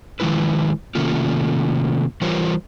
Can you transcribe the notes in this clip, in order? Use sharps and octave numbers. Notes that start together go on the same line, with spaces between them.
D#3 F3 G#3 E4 B4
C3 D#3 A3 A#3 C#4 F4
E3 G3 F4 A#4 C5 C#5